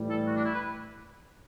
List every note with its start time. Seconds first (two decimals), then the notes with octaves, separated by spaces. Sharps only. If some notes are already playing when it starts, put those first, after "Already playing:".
Already playing: A2 E3 G3
0.10 A4
0.27 F#4
0.36 D4
0.45 E4
0.54 B4